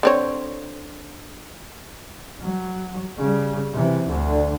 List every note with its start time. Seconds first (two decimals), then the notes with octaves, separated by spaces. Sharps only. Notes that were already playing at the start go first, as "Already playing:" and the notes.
0.03 D3 C4 C#5
2.41 F#3
3.18 C#3 G3
3.74 C3 E3
4.10 D2 D3